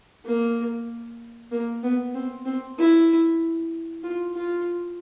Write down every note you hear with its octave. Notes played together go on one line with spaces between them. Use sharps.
A#3
A#3
B3
C4
C4
E4
F4
F4